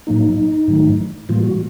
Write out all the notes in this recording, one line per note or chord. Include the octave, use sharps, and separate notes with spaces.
A2 F#3 A#3 D#4
G#2 D#3 F#3 A3
A2 E3 G3 A#3 F4
F#4